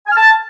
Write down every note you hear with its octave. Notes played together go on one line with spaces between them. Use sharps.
G#5
F6
A5